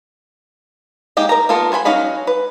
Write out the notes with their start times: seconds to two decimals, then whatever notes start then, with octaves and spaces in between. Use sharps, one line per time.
1.17 G#3 A#3 D#4 G4
1.29 A#4 A#5
1.49 A#3 B3 F4 A4 A#4
1.72 G#4 C5 G#5 B5
1.85 F#3 C#4 D#4 F5 B5
2.27 B4